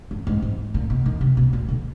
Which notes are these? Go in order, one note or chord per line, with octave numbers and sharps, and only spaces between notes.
G2
G#2
G#2
A#2
B2
D#3
C3
B2
A#2
D3